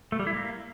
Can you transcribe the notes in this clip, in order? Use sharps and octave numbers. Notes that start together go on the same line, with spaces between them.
A3
G3
E4
A#3